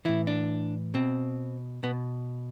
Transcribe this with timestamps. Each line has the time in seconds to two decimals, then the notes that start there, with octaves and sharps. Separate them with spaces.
0.05 A2 E3 E4
0.27 D4
0.94 B2 C4
1.83 B2 B3